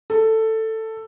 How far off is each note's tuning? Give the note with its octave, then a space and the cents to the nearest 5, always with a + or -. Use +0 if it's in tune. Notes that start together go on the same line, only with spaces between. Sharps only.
A4 +10